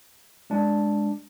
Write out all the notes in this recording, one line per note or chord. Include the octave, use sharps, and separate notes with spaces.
G#3 D4